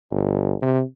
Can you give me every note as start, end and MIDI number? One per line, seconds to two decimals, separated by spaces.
0.11 0.53 31
0.62 0.82 48